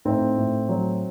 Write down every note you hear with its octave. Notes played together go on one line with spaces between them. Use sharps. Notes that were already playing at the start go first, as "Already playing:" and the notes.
A2 C4 D#4
A2
F#3